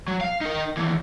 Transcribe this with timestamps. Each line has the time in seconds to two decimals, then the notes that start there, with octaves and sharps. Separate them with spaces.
0.08 F#3
0.21 F5
0.41 D#4 A#4
0.77 D#2 E3